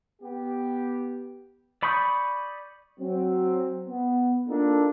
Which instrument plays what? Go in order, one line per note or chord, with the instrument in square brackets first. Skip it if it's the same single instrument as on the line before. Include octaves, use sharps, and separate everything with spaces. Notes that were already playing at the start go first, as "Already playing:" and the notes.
[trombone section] B3 G4
[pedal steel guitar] D5 B5 C#6 D#6 G6
[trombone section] F#3 C4
B3
A#3 D4 D#4 F4 A4 A#4